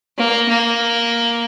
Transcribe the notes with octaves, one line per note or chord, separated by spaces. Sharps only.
A#3
A#3